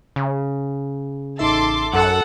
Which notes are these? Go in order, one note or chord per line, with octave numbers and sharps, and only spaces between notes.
C#3
A1 D#4 A4 E5 C6 D6
F#2 A4 F#5